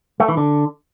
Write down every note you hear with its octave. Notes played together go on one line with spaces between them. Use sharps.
A3
E3
D3